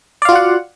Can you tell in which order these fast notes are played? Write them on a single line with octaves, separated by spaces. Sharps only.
D5 F5 F4 F#4 F#5